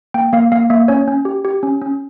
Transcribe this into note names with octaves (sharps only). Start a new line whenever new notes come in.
A#3 G5
A#3 F5
A#3 F5
A#3 E5
C#4 C#5
C#4
G4
G4
C#4
C#4